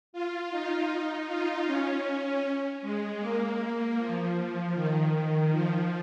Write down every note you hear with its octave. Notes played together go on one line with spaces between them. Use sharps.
F4
D#4
F4
C#4
G#3
A#3
F3
F3
D#3
F3